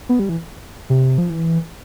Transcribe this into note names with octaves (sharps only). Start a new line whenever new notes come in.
B3
G3
E3
C3
F3
E3